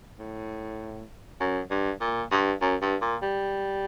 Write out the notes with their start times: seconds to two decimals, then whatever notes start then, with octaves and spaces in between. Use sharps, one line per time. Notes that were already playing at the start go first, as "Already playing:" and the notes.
0.19 A2
1.40 F#2
1.71 G2
2.01 A#2
2.32 G2
2.61 F#2
2.82 G2
3.02 A#2
3.22 G3